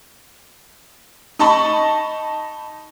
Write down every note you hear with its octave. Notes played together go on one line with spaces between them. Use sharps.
D#4 D#5 A5 B5 C#6